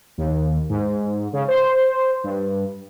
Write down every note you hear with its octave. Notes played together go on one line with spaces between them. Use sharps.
D#2
G#2
C#3
C5
G2